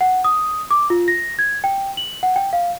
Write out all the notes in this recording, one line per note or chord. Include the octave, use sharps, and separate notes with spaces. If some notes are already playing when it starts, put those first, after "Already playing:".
F#5
D#6
D6
F4
A#6
G#6
G5
F#7
F#5
G5
F5